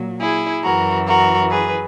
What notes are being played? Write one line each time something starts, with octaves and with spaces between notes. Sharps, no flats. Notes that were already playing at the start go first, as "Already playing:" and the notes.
Already playing: A#2 F#3
E4 G#4
F#2 E3 F#4 A#4
F#4 A#4
G#4 B4